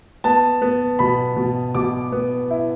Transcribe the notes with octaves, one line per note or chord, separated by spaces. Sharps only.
B3 A5
B3
B2 B5
B2
B2 D6
B3
E4